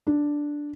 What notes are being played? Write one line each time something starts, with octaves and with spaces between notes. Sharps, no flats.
D4